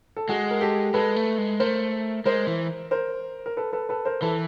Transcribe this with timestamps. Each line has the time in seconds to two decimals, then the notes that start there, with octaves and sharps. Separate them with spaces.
0.16 A4
0.29 G#3 F#4 G#4
0.51 A#4
0.61 G4 A4
0.94 G#3 A4 B4
1.16 A3
1.38 G#3
1.60 A3 A#4 C5
2.26 G#3 A#4 C5
2.47 E3
2.91 A#4 C5
3.46 A#4
3.57 A4 B4
3.72 A4 B4
3.89 A4 B4
4.05 A#4 C5
4.22 E3 A4 B4